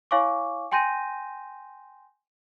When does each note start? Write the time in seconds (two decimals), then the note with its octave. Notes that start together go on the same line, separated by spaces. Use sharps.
0.11 E4 C#5 F5 G#5 C#6 D6
0.72 G5 G#5 C6 G6 A#6 D#7